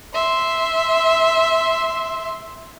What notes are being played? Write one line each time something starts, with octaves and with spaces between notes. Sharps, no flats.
E5 C6